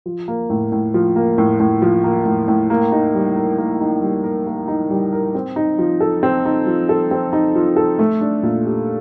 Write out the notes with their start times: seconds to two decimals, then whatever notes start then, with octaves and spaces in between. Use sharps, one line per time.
0.06 F3
0.28 A#3
0.50 A2
0.72 A2
0.94 F3
1.16 A#3
1.38 A2
1.60 A2
1.82 F3
2.04 A#3
2.26 A2
2.48 A2
2.70 A#3
2.92 D#4
3.14 G3
3.36 A#4
3.58 A#3
3.81 D#4
4.02 G3
4.24 A#4
4.46 A#3
4.68 D#4
4.90 G3
5.13 A#4
5.35 C4
5.56 D#4
5.79 F3
6.01 A4
6.23 C4
6.45 D#4
6.67 F3
6.89 A4
7.11 C4
7.33 D#4
7.55 F3
7.76 A4
7.99 A3
8.21 D4
8.43 A#2
8.65 G4